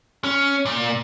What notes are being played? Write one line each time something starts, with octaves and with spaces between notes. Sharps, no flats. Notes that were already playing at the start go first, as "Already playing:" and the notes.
C#4
A#2